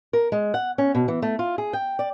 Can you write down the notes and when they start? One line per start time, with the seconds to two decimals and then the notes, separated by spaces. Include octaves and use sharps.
0.13 A#4
0.32 G#3
0.54 F#5
0.78 C#4
0.95 B2
1.08 E3
1.22 A3
1.39 F4
1.58 G#4
1.73 G5
1.99 D5